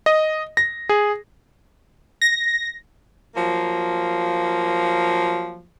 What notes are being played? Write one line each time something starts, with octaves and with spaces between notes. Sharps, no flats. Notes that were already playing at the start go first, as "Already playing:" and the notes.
D#5
A#6
G#4
A#6
F3 F#3 A#3